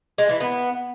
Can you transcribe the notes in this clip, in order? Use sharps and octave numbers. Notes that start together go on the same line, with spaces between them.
G#3
E3
B3